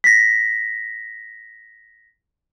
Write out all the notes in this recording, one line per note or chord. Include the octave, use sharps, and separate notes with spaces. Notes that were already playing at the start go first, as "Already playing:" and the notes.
A#6 B6